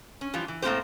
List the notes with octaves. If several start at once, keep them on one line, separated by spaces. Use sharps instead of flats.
C#4
E3 F3 G3 F4
E3
A2 A3 A#3 C4 G4 C5